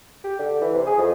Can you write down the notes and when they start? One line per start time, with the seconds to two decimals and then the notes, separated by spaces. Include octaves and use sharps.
0.24 G4
0.39 D3
0.62 E3
0.74 C3
0.87 G#4
0.98 F2